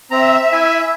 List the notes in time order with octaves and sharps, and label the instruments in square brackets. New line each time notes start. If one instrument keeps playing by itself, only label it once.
[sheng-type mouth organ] C4 A#5 [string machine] E5
[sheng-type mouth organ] E4 G#5